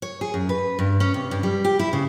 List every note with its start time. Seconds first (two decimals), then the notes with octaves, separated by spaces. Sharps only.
0.02 C#5
0.21 G#4
0.34 F#2
0.49 B4
0.79 G2
1.00 C#4
1.14 C3
1.31 G2
1.43 G3
1.64 G4
1.79 E4
1.93 C#3